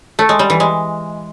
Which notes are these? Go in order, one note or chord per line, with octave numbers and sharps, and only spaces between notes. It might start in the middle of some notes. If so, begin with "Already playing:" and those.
A3
G#3
G3
E3
G#3